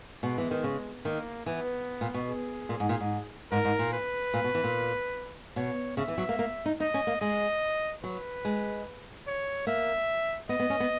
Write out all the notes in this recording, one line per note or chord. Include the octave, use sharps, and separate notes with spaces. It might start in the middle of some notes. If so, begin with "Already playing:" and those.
B2 G#3
E3
D#3
C#3
D#3 A#3
E3 B3
A#2
B2
G#4
A#2
G#2
A#2
G#2
G#2 A#4
G#2
A#2
B4
A#2
B2
E3
A#2
B2 C#5
C#3 E5
E3
F#3
A#3
A#3
D#4
D#4 D#5
C#4
A#3
G#3 D#5
F#3 B4
G#3
C#5
A#3 E5
B3 D#5
B3
C#4
B3